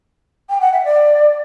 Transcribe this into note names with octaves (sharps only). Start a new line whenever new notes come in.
G5
F#5
E5
D5